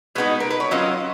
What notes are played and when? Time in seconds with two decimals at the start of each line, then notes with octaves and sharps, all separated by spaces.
0.15 B2 G#3 B3 D#4 B4
0.40 A#4
0.50 B4
0.60 C#5
0.71 F#3 C#4 F4 D#5